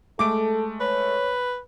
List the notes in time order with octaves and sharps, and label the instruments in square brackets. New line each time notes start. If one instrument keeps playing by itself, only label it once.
[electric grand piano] G#3 A3 D7 [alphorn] A4 [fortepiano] D6
[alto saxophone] B4 [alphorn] C#5